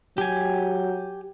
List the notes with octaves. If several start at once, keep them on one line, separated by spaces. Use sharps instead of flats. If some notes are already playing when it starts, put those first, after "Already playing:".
F#3 G4 G#5